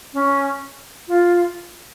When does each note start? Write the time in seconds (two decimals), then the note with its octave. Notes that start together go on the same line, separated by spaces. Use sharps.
0.14 C#4
1.08 F4